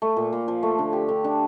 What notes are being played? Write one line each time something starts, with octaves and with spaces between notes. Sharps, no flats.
A3
A#2
A#2
F3
A3
D3
G4
D3
D4